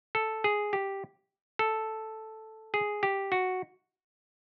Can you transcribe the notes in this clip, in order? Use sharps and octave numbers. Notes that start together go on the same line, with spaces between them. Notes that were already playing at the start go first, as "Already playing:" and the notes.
A4
G#4
G4
A4
G#4
G4
F#4